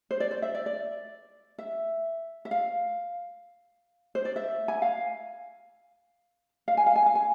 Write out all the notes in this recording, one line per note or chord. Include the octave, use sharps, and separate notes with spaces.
C5
D5
C5
E5
D5
D5
E5
E5
F5
C5
D5
E5
G#5
F5
F5
G#5
F5
G#5
F5
G#5